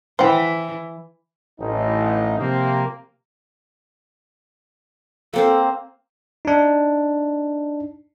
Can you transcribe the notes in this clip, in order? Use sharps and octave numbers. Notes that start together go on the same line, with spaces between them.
E3 C5 F#5 G5
A1 D#4
C3 F3 A#3 C4
A#3 C4 A4 C5
D4 D#4